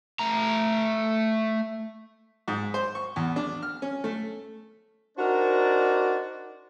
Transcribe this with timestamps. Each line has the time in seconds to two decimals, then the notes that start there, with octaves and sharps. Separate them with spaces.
0.19 A3 A#5
2.48 G#2
2.74 C5
2.95 C#6
3.16 E2
3.36 D4
3.62 F6
3.82 C#4
4.04 A3
5.18 D4 D#4 F#4 A#4 C5 D5